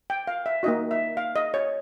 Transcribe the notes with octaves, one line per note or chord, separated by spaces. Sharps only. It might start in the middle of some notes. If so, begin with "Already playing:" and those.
G5
F5
E5
A#3 D#4 F#4 D#5
E5
F5
D#5
C#5